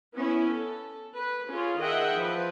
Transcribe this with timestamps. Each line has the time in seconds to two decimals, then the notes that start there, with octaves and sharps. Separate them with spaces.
0.14 B3 C#4 E4
0.51 A4
1.15 B4
1.48 C#4 F4 G#4
1.81 D#3 G#4 D#5 E5 F#5 G5
2.16 F3 B4